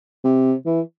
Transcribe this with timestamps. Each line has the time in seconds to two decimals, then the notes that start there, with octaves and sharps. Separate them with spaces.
0.24 C3
0.66 E3